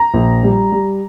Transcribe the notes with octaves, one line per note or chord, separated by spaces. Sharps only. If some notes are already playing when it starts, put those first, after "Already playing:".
Already playing: A#5
A#1
G3
G3